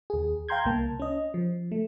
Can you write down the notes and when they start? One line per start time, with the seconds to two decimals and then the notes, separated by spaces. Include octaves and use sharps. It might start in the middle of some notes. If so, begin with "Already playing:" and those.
0.10 D#2 G#4
0.49 F5 G5 A#5 C6 G6 G#6
0.65 C2 A#3 A5
1.00 C#4 D#5
1.34 F3
1.72 A3